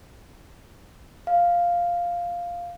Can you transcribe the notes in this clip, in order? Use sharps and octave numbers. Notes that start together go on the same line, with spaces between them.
F5